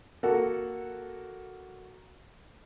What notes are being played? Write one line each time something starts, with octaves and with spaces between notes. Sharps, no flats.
A#3 F#4 A4 F#5